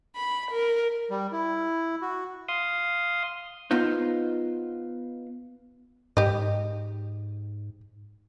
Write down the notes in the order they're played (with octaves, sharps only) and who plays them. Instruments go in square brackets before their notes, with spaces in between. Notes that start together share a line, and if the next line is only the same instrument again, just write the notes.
[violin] B5
A#4
[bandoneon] G3
E4
F#4
[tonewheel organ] F5 C6 D#6
[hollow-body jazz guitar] B3 D#4 F4 C5
[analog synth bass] G#2 [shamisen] G4 D#5